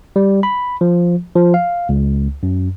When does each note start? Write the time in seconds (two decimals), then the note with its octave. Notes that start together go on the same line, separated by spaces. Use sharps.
0.16 G3
0.43 B5
0.81 F3
1.36 F3
1.54 F5
1.89 C#2
2.43 F#2